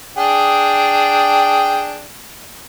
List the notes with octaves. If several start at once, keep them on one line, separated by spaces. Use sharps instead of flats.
D4 G#4 G5